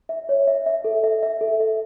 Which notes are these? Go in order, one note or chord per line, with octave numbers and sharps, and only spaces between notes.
E5
C#5
E5
E5
A4
E5
E5
A4
E5